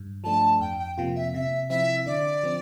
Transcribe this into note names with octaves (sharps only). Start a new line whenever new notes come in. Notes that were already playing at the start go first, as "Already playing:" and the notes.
Already playing: G2
F3 A3 D4 A5
F2 G5
G5
C3 F3 A#3 F4 G5
E5
C3 E5
F3 C4 E4 E5
D3 D5
F3 C4